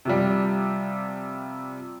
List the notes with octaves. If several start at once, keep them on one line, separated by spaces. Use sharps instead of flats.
C3 F3 G3